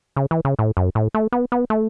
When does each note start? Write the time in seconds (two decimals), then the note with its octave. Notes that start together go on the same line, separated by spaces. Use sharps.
0.16 C#3
0.31 E3
0.45 C#3
0.59 A2
0.77 F#2
0.95 A2
1.14 A3
1.32 B3
1.52 B3
1.70 A3